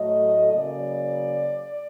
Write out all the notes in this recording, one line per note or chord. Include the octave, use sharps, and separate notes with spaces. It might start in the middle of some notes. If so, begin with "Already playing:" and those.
Already playing: A2 F#3 A3 D#5
C#3 F#3 A#3 D5